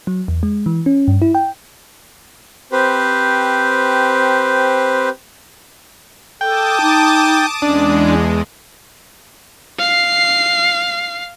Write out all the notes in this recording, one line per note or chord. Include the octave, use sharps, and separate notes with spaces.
F#3
E2
G#3
E3
C#4
G2
E4
G5
C4 G4 B4 C5
A4 G5 A5 D6 D#6
D#4
E2 G#3 C#4 D4
F5 C7